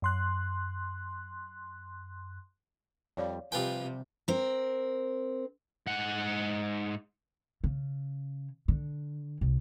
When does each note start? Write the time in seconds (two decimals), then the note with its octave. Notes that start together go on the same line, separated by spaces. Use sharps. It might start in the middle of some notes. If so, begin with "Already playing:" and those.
0.02 F#2 C6 F#6
3.17 F2 G3 C#5 D5 F5
3.52 C3 F3 G3 F4 G4 B4 G5 G#5
4.28 C4 A#4
5.87 G#2 F#5
7.64 C#3
8.68 D3
9.41 C2